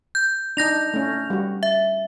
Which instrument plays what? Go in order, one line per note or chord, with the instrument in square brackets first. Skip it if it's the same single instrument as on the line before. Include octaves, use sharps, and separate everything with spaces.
[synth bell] G6
[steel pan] D4 D#4 [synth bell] G6 A#6 F7
[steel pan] A3 C#4
G3 F#4
[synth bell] E5